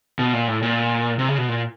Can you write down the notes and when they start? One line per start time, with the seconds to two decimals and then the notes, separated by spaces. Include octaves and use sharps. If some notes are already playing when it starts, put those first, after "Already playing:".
0.19 B2
0.33 A#2
0.48 A2
0.63 A#2
1.19 C3
1.28 C#3
1.38 B2
1.48 A#2